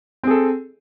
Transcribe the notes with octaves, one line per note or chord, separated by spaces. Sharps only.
C4 G#4 A4